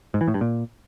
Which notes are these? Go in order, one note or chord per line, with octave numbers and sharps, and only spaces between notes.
G#2
E3
A2
G2
A#2